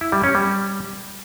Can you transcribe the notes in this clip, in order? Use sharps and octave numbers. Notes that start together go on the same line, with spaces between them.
E4
G3
C#4
G3